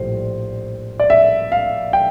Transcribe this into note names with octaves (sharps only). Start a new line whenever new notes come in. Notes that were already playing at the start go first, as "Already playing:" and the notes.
Already playing: A#1 A2 G3 C5
D5
E5
F5
G5